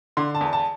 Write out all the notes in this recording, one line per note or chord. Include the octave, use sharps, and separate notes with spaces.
D3 C6
A5
E2
A5